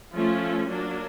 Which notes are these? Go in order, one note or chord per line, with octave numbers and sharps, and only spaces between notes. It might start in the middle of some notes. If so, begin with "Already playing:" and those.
F3 A3 C#4 F4
F#3 A#3 D4